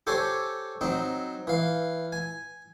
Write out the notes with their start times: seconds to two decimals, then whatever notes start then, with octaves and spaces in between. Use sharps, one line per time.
0.07 G4 A4 C5 C#5 G#5
0.81 F#3 C4 D#4
1.47 E3 F5
2.12 G#5